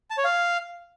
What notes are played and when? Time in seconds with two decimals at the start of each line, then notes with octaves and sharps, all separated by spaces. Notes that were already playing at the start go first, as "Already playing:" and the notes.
0.10 A5
0.18 C#5
0.25 F5